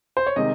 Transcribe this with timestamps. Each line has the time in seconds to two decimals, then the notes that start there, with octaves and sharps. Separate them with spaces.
0.17 C5
0.27 C#5
0.36 C3 D#3 G#3 D#5